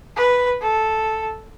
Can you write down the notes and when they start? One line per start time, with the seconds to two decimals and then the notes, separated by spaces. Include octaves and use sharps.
0.16 B4
0.62 A4